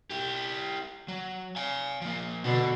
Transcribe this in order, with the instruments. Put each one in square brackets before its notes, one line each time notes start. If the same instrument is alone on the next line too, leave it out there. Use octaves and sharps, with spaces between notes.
[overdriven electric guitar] E4 G4
F#3
F5 G#5
F3 A#3
[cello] B2 [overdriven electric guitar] D3 D4